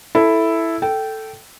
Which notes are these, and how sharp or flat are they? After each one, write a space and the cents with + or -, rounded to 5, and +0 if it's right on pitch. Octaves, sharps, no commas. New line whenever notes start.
E4 +0 A4 +0
A4 +0 G5 -15